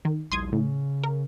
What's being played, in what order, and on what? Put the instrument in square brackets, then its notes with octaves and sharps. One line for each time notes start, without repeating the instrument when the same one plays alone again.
[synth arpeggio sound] D#3
[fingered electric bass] A#1 G3 [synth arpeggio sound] C6 D#6 G#6
[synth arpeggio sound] A2 [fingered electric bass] C#3
[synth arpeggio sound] A#4